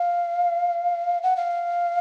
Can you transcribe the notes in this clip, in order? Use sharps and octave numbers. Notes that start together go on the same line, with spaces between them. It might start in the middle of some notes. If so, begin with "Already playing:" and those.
Already playing: F5
F#5
F5